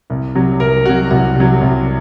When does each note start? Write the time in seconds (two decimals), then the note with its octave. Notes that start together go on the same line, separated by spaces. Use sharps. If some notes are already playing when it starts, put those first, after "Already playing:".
0.10 C2
0.35 C3 F#3
0.60 C2 A#4
0.85 C3 F#3 F#4
1.11 C2 F#4
1.36 C3 F#3
1.61 C2